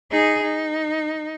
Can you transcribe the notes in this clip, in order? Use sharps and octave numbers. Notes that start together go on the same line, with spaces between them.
D#4 G#4
D#4